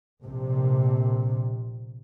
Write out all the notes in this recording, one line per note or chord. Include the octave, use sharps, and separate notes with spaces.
A#1 C3